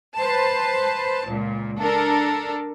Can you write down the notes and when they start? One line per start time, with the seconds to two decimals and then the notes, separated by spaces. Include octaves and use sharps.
0.16 B4 C5 A5
1.26 C#2 A#2
1.79 D4 A4 A#4